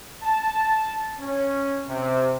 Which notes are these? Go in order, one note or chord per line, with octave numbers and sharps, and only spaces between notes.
A5
C#4
C3